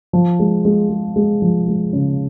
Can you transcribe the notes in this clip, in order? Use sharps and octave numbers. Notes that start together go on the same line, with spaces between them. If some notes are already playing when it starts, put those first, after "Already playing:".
F3
G#3
G#3
G#3
G#3
F3
G#3
C#3